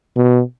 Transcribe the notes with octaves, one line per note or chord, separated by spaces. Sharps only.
B2